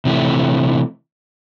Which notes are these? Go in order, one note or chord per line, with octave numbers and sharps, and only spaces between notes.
C3 E3 A3